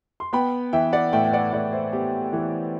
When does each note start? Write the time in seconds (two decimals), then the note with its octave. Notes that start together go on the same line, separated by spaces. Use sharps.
0.20 C6
0.33 B3 G5 B5
0.73 E3 E5 G5
0.93 D5 F#5
1.13 A2 E5 G5
1.24 G5
1.33 D5 F#5
1.53 A2 D5 F#5
1.73 C5 E5
1.93 B3 G4
2.33 E3